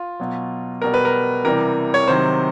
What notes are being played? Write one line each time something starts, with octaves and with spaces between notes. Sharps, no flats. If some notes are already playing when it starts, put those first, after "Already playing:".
Already playing: F4
B2 F#3
B2 G3 A#4
B4
A#4
C3 E3 G3 A#4
C#5
C3 D#3 F#3 C5